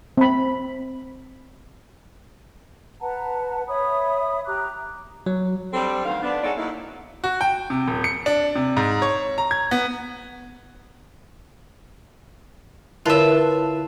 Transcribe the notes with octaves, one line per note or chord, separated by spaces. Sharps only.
C4 B5
B4 F#5 A5 A#5
C#5 E5 B5 D#6
G4 A#5 D6 F#6
F#3
G3 C4 D4 G4 A4
D2 D#3 B3 C5 F5
B3 D4
G#3 D#4 F#4 A4 C#5 D5
F#3 A#3 D#4 E4
F#4
G5
C3
D#1
C#7
D4
C3
G#2
C#5
A#5
G#6
B3
D3 E4 F4 A#4 B4 C#5 E5 A5